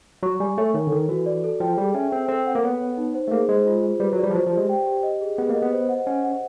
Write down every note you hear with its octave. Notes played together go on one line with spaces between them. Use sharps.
F#3 C#6
G3 G#5
A3 C#5
D#3 C#5
D3
D#3 A4
E3 F#4
D5
A4
F3 G5
G3 G#4
C#4 E5
C4 G5
C4 A4
F#5
A#3
B3 C#5
C#5
D#4
C5
A3
A#3 G#4
G#3 C5
F4
G#4
G3 B4
F#3
D5
G3
F3
F#3 C5
F3
G4
G#3
G5
G4
D#5
G#4
B3 G#4
A#3
D#5
B3
C5
F#5
C#4 F#5
F#5